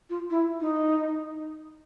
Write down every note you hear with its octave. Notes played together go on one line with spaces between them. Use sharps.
F4
E4
D#4